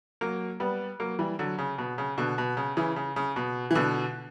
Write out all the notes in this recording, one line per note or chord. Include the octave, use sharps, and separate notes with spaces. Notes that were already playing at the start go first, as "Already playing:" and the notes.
F#3 A#3
G3 B3
F#3 A#3
E3 G3
D3 F#3
C#3
B2
C#3
B2 D3
B2
C#3
C#3 E3
C#3
C#3
B2
E3
B2 D3